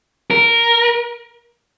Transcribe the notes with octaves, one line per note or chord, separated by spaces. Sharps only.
A#4